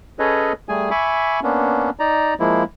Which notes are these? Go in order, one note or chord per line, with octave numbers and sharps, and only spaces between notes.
C#4 G#4 A4 B4 C#5 D#5
G3 A3 G#4 G#5
E5 G#5 B5 C#6 D6
A#3 B3 C#4 D4
D#4 D5 A#5
F3 G#3 A#3 E4